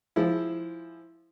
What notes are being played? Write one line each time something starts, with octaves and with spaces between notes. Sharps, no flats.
F3 G#3 E4